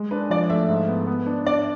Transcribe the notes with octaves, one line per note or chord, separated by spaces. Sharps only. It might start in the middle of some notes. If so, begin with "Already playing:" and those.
Already playing: G#3
D4 B4
F3 D5
A3 E5
G#2
B3
B3
D4
D4 D5